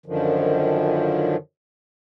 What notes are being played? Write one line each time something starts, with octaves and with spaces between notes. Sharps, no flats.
F#2 D3 D#3 F3